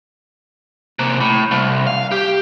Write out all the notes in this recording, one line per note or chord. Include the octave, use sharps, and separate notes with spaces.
C3 A#3
A2
C2
F5
G4